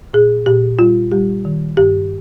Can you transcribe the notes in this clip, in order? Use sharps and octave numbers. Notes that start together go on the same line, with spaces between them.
A#2 G#4
A#2 G4
G3 F4
G3 G4
D#3
G2 G4